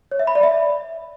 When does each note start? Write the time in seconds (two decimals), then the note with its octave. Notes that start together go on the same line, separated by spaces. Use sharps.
0.11 C#5
0.19 E5
0.27 B5
0.35 D5
0.43 E5